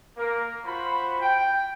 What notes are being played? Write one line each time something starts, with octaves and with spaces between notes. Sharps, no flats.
A#3 A#4
F4 F#4 C5 B5
G5